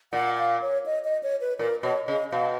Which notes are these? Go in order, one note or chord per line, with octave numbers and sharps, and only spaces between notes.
A#2 F#5
F5
C#5
D#5
D#5
C#5
B4
A#2 A#4
B2 C#5
C#3 D#5
B2 F5